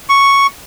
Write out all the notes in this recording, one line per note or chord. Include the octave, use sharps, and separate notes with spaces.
C#6